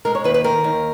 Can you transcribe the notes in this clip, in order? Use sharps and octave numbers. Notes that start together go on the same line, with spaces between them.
G#3 A#4
C#5
D#2 B4
B4
D#3 A#4
D#2